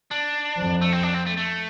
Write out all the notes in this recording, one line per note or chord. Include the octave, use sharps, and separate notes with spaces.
D4
F2
A3
C4
D4
C4
A3
A3